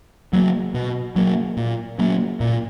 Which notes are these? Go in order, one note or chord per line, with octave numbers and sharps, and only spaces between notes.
F#3 A#3
B2
F#3 A#3
A#2
F#3 A#3
A#2